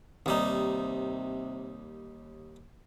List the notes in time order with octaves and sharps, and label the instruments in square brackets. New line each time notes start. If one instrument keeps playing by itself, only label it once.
[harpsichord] D#2 G3 D#4 [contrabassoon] C3